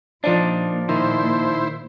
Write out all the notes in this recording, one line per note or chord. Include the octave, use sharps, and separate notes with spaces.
A#2 F3 D4 D#4 D5
D#3 E4 C5